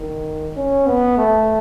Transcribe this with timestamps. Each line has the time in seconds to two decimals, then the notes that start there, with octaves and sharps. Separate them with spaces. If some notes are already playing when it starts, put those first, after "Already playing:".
Already playing: D#3
0.56 C#4
0.87 B3
1.18 A3